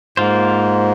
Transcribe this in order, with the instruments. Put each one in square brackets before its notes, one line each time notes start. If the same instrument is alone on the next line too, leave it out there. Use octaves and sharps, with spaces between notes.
[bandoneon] G#2 [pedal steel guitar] A#3 F4 C5